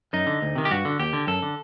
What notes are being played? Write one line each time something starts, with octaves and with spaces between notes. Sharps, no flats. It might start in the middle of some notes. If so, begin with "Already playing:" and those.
F#2 D#4
D3
D2
C3 D#3
G4
G2 F#4
D3
D#2 G4
D3
F#2 A4
D3